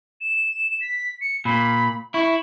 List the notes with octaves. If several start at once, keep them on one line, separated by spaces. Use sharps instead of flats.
E7
B6
C#7
A#2 B5
E4 C#6